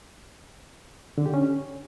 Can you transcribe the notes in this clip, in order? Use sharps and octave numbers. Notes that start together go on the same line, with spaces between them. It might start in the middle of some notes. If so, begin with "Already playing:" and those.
D3
G4
C#4